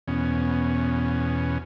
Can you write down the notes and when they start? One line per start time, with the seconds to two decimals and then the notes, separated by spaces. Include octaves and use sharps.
0.08 E2 B2 C#4